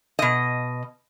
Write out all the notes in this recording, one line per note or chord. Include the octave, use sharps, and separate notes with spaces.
B2 D#5